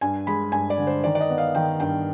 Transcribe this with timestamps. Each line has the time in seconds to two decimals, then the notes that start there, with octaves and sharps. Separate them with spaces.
0.01 G2 G#5
0.27 G#3 B5
0.52 G2 G#5
0.70 D5
0.78 D3
0.87 C5
1.04 D#3 D5
1.15 D5
1.20 D#5
1.30 B3
1.38 F5
1.55 D#3 G5
1.80 G2 G5